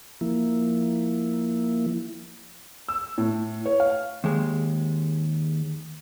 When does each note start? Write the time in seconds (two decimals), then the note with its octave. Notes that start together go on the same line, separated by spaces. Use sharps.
0.21 F3 A#3 E4
2.88 E6
3.18 A2
3.66 C#5
3.80 F5
4.24 D#2 G#3